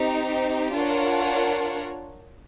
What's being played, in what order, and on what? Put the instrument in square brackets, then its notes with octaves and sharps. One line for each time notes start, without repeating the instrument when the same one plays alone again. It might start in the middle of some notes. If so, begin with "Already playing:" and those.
Already playing: [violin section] C4 D#4 G4
D4 F4 A#4 C#5 F#5